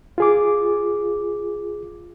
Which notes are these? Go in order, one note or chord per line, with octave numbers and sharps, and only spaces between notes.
F4 G#4 D6